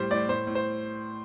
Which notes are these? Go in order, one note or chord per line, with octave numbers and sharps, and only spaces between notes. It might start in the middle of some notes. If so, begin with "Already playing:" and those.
Already playing: A2 G3 C5
A2 D5
A2 C5
A2
C5